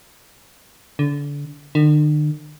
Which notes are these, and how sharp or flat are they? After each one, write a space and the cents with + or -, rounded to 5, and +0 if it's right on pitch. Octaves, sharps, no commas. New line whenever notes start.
D3 -30
D3 +45